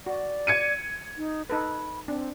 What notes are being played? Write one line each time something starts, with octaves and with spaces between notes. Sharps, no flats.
F#4 D5
G#6 C#7 D#7
D#4
D#4 A4 B4 B5
C4 D4